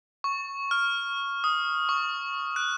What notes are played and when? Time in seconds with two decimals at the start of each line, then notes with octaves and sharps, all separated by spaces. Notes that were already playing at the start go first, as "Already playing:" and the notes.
0.24 C#6
0.71 F6
1.44 D#6
1.89 C#6
2.56 F#6